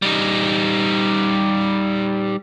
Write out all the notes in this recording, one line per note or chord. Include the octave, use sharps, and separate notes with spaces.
G3 D#4